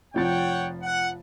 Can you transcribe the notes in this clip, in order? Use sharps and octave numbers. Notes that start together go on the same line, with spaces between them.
F1 F3 C#5 F#5 G5 A6
F#5